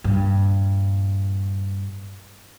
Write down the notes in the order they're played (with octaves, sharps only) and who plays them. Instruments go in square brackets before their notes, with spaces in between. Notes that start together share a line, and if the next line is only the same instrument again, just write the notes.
[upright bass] G2 A#2